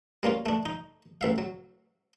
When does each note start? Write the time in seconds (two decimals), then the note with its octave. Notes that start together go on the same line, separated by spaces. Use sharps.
0.23 G3 A#3 C#4 F4
0.46 A3 D4
0.66 D#4
1.21 A1 E5 F5
1.38 F#3